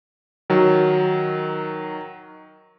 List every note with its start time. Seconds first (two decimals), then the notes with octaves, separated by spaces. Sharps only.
0.50 D#3 F#3